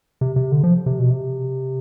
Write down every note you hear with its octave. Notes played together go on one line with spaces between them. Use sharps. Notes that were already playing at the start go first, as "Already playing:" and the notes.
C3
C3
D3
F3
C3
B2
C3